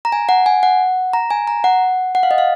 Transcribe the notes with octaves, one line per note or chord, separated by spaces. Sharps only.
A#5
G#5
F#5
G#5
F#5
A#5
G#5
A#5
F#5
F#5
F5
D#5
F5